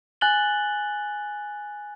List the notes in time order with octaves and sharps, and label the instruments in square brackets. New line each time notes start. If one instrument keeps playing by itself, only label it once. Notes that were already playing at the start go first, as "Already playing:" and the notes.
[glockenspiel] G#5 F#6 A6 F#7 G7